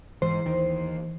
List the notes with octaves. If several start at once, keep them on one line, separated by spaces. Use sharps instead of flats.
G#2 E3 C5
D#2 D#3